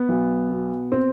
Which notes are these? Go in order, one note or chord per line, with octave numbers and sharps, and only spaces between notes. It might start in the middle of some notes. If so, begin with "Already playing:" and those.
Already playing: B3
B1
B2
C4